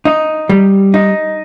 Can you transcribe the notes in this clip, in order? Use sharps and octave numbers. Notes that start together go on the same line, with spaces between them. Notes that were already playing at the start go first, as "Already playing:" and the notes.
D#4
G3
D#4